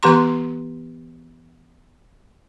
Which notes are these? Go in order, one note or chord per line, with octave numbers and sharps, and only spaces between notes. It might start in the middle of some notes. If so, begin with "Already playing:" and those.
E3 B3 G4 A#5 C6